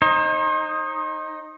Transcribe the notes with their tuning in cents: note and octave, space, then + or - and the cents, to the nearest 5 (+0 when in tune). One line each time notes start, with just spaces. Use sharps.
D#4 +0 C5 +40